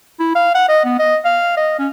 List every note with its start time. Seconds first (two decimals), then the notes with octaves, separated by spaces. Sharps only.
0.20 E4
0.35 F5
0.55 F#5
0.69 D#5
0.85 B3
0.99 D#5
1.25 F5
1.57 D#5
1.79 C#4